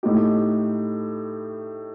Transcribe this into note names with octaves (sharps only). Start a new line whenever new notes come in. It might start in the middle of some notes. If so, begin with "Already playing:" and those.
A2 A3 D#4 G4